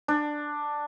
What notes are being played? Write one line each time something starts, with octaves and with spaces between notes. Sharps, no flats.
D4